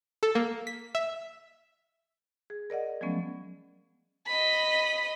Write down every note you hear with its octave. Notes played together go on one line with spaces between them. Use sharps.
A4
A#3
B6
E5
G#4
A#4 D5 D#5 F#5
F3 F#3 G#3 A3 B3 C#4
D#5 B5